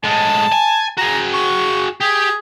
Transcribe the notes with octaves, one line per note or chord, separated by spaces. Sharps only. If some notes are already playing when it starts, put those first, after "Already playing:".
A2 G#3 A5
G#5
F#4 G#4 A#5
C#6
G4 G#4